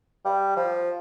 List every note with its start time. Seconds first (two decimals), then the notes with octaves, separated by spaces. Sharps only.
0.25 G3
0.57 F3